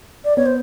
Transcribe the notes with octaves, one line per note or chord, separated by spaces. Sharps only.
D5
B3 C#5
C5